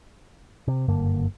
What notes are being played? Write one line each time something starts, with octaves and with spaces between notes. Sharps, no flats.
C3
F#1 G2 D3 A#3